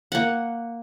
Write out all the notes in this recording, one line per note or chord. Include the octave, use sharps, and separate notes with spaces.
A#3 F#5